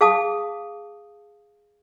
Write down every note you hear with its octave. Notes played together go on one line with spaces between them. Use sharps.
G#4 F5 A5 D#6